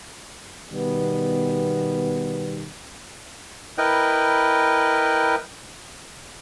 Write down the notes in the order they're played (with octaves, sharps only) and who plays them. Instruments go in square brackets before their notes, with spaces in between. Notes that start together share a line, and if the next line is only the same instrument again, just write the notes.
[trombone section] B2 D#3 G3 B3
[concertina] E4 A#4 B4 D#5 G5